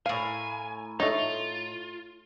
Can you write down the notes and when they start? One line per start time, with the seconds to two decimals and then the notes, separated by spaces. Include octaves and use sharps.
0.06 A2 A#4 F5 G#5
1.00 A3 D#4 F4 C#5